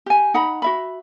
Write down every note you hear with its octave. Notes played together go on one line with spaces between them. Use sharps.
G4 G#5
D#4 F#5 A#5 B5
F#4 E5 B5